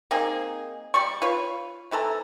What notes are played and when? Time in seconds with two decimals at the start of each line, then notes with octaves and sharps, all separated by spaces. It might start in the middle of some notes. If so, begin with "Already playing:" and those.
0.11 A#3 C4 D#4 G#4
0.94 G3 D5 C#6
1.22 F4 B4 C#5
1.91 C3 E3 A4 A#5